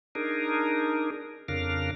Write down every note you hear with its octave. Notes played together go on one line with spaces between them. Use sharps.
D4 D#4 G#4 A#4
F2 C#3 D4 A#4 F5